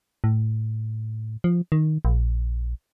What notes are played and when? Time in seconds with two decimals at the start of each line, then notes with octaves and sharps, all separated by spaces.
0.24 A2
1.44 F3
1.72 D#3
2.05 A#1